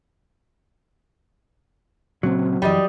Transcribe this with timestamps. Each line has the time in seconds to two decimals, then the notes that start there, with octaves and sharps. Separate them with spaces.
2.23 A#2 C#3 F#3 C4
2.62 F#2 E3 G3 D5 D#5